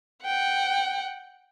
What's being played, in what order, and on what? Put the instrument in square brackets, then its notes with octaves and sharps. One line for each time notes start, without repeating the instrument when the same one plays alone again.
[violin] F#5 G5